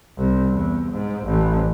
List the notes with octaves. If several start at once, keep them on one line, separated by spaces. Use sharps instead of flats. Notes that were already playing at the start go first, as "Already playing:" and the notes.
C2
E2
G#2
A1